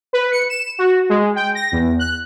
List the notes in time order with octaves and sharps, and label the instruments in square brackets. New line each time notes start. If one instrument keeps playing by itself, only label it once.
[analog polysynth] B4
C#7
E7
F#4
G#3
G5
A#6
E2
F#6